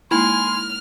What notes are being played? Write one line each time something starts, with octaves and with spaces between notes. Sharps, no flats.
G#3 A#3 D#4 E4 G#5 C6 F6